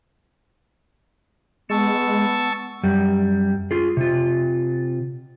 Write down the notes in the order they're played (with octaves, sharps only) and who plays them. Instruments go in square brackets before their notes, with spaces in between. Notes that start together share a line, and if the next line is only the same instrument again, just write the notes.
[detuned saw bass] G#3 [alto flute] B3 [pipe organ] A5 C#6 E6
[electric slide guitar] F#2 G3
F4 G#4
C3 F4